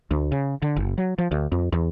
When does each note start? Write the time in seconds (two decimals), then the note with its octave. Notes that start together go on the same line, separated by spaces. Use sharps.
0.11 D2
0.32 C#3
0.62 D3
0.76 F#1
0.98 F#3
1.18 F3
1.31 D2
1.52 F2
1.72 E2